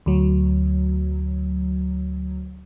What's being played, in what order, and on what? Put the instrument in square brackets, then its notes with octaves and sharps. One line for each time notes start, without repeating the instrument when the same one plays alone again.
[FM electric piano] D2 F#3